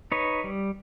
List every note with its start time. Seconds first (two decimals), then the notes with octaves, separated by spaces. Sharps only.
0.12 D#4 B4 C#5
0.44 G3